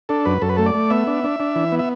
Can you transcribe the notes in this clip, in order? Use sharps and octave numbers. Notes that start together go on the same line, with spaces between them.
D4 A4
F#2 B4
F#2 A4
B4
A3 A4
D5
A3
B3 E5
D4
D4
D4
E3
B3
E5